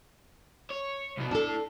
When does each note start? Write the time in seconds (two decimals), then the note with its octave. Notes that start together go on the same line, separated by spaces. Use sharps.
0.70 C#5
1.17 C2 B2
1.31 D4 E4 A4 A5